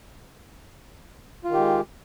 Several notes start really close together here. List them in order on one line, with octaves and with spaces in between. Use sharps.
F4 D#3 G4 G#3